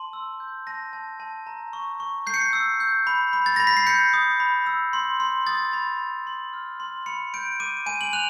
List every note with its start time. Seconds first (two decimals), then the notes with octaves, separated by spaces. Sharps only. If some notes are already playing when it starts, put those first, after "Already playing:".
Already playing: A5 C6
0.13 E6
0.40 G6
0.67 A5 A#6
0.93 A5
1.20 A5
1.47 A#5
1.73 C#6
2.00 C#6
2.27 G6 C7
2.34 C#7
2.41 C7
2.53 E6
2.80 G6
3.07 B5
3.33 B5
3.46 A6
3.56 B5 A#6
3.67 B6
3.77 C7
3.87 G6 C#7
4.13 D#6
4.40 B5
4.67 E6
4.93 C6
5.20 C6
5.47 D#6 A6
5.73 B5
6.00 B5
6.27 C6
6.53 F6
6.80 C6
7.06 B5 C#7
7.34 G6 D7
7.60 D6 D#7
7.86 G#5 D#7
8.01 F#7
8.13 F#6 F7